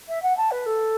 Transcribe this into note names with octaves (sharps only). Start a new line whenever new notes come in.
E5
F#5
A5
B4
A4